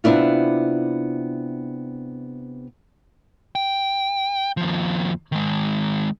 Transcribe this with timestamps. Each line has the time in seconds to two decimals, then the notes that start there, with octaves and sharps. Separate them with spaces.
0.04 C3 B3 D4 E4 F4
3.55 G5
4.57 D#2 F3
5.32 D#3 G#3